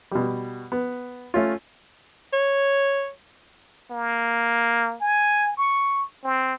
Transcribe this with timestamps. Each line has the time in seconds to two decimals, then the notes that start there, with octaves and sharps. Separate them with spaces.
0.11 B2 G3
0.72 B3
1.34 A3 C#4 F4
2.33 C#5
3.91 A#3
5.01 G#5
5.57 C#6
6.24 C4